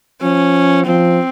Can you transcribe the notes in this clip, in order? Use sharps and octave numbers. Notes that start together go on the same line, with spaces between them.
F3 C#4
F3 C4